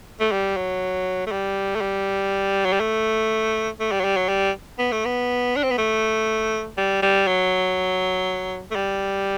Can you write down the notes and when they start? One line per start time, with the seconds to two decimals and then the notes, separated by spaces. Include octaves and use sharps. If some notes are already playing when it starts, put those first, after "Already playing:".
0.20 A3
0.31 G3
0.57 F#3
1.26 A3
1.32 G3
1.75 A3
1.81 G3
2.65 F#3
2.72 G3
2.80 A3
3.80 A3
3.91 G3
4.00 F#3
4.04 G3
4.17 F#3
4.28 G3
4.78 B3
4.92 A3
5.05 B3
5.56 D4
5.63 C4
5.71 B3
5.78 A3
6.77 G3
7.02 G3
7.27 F#3
8.71 A3
8.75 G3